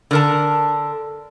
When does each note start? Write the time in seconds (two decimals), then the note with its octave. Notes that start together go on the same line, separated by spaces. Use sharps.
0.11 D3 A#4 A5